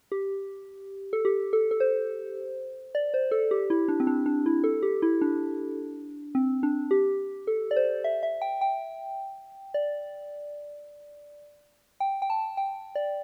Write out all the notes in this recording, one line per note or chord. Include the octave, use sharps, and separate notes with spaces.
G4
A4
G4
A4
A4
C5
D5
C5
A4
G4
E4
D4
C4
D4
D4
E4
A4
G4
E4
D4
C4
D4
G4
A4
D5
C5
E5
E5
G5
G5
D5
G5
G5
A5
G5
D5